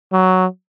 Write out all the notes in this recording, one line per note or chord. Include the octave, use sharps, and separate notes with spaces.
F#3